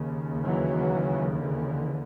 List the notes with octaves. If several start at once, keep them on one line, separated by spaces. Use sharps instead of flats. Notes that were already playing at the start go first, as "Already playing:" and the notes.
Already playing: D#2 C#3
E3 F#3
D3 E3